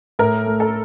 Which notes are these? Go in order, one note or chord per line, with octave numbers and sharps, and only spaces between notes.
A2 A#4
A3
A4